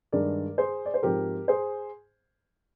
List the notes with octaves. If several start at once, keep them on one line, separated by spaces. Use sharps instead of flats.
G2 D#3 G#3 D4 A#4 D5
G#4 C5
D5
C5
G#2 F3 C4 G4 A#4
G#4 C5